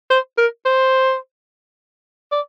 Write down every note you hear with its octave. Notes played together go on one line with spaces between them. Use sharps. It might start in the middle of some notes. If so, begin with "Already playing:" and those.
C5
A#4
C5
D5